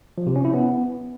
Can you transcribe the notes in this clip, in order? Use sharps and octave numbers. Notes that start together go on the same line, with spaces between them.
F3
C3
C#4
E4
B3